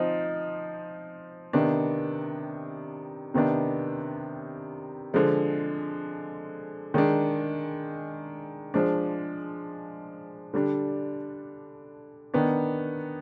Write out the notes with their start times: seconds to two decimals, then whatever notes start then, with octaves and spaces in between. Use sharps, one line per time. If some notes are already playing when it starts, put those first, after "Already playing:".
Already playing: F3 C4 D#4
1.53 C3 D#3 B3 D4
3.34 C3 D#3 B3 D4
5.14 D3 F3 G#3
6.94 D#3 G#3 D4
8.74 F3 G#3 D4
10.54 D3 G3 D4
12.34 D#3 B3 D4